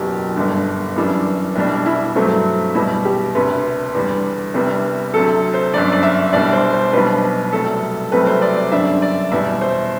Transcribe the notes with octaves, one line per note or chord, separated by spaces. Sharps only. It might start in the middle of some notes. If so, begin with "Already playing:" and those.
Already playing: F#1 E2 B2 F#3 G4
G1 G2 D3
F#2 E3 G3 D4
C2 B2 G3 D4
E4
G2 F#3 A3 C4
E2 B2 G3 E4
G4
E1 D2 C3 B4
E2 D3 G3
C2 C3 G3 B3 D4
D2 C3 F#3 A4
C5
G1 F#2 D3 D5
D5
E5
C2 B2 G3 D4 D5
C5
C5
B1 B2 G3 D4 B4
C2 C3 F#3 A3 A4
C2 C3 F#3 A3 C4 B4
C5
D5
D5
G1 F#2 D3 G3 D4 E5
D5
E2 B2 G3 E5
C5